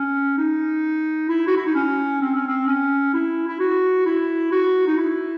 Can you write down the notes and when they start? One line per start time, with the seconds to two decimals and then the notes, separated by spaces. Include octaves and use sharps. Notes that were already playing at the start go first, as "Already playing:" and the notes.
Already playing: C#4
0.38 D#4
1.29 E4
1.47 F#4
1.57 E4
1.66 D#4
1.75 C#4
2.21 C4
2.35 C#4
2.47 C4
2.67 C#4
3.14 E4
3.48 E4
3.60 F#4
4.06 E4
4.52 F#4
4.87 D#4
4.98 E4